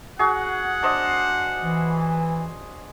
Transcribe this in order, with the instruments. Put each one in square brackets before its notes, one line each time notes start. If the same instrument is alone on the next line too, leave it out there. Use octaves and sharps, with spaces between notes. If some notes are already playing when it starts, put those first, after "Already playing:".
[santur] F#4 G#4 [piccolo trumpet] F#5
[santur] D4 C5 D#5
[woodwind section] E3